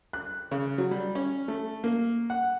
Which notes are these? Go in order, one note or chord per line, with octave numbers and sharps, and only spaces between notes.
F#6
C#3
F#3
G3
C#4
A3
A#3
F#5